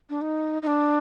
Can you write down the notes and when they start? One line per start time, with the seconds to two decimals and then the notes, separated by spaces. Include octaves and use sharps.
0.10 D4
0.21 D#4
0.62 D#4
0.67 D4